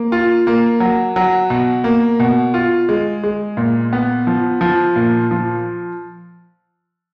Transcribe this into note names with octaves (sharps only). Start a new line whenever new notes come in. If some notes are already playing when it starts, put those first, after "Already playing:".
Already playing: A#3
F4
A#3
F#3
F#3
B2
A#3
B2
F4
G#3
G#3
A#2
B3
F3
F3
A#2
F3